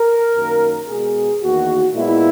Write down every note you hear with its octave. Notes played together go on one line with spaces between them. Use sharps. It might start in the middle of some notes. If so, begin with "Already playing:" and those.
Already playing: A#4
F#2 D#3 A#3
B2 G#3 B3 G#4
E2 D#3 A#3 F#4
A#2 G#3 B3 E4